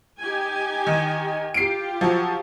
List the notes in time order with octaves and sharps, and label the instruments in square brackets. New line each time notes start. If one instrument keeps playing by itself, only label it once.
[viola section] D#4 G4 G#5
[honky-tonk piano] D#3
[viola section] F4 G4 [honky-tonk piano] C7 D7
[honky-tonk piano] F3 F#3